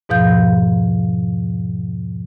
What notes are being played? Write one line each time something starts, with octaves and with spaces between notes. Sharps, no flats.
E2 G#2 B2 F3 F5 G6